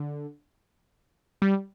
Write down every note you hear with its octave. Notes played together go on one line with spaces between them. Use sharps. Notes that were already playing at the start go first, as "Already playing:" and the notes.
Already playing: D3
G3